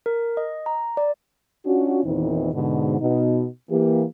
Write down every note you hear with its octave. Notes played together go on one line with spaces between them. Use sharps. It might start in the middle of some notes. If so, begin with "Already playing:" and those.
A#4
D#5
A#5
D5
C#4 D4 F4 F#4
E2 A#2 D#3 E3 C4 D#4
G#2 B2 D3
B2 D#4
E3 A#3 G4